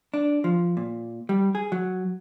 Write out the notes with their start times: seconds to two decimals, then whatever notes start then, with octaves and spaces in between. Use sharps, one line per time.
0.14 D4
0.44 F3
0.77 A#2
1.29 G3
1.55 G#4
1.72 F#3